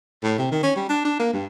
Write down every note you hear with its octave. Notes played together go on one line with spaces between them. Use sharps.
A2
C3
D#3
C#4
G3
D4
D4
A#3
G2